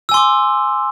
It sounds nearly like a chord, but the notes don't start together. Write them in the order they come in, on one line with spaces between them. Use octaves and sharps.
E6 G#5 C6 D6